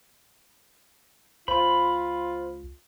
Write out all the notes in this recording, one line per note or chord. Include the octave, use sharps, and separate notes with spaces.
C#2 F4 C5 B5